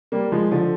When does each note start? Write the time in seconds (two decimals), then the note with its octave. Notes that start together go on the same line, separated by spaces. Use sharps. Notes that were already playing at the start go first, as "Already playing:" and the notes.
0.12 G3 A#3
0.32 F3 G#3
0.51 D3 F3